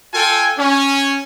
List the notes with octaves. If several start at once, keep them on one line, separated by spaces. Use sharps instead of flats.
F4 A4 G5 G#5
C#4